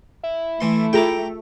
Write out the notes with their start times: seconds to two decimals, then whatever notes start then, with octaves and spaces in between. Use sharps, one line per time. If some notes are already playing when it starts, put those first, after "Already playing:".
0.23 E4
0.61 E3 A3 C6
0.93 F4 G#4 A4 G5 A#5 D6